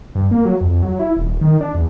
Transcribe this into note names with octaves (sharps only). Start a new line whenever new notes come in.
G2
A#3
F#3
F2
F#3
E4
D#1
D#3
D4
E2